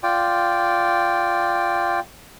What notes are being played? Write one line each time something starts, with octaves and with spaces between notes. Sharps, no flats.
F4 D5 G5